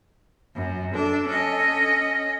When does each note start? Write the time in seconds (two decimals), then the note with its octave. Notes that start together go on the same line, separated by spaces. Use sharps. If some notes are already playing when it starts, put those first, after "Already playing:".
0.55 F#2
0.94 D4 A4
1.27 C#4 D#5